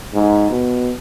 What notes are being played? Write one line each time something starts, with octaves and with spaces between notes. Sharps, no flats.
G#2
B2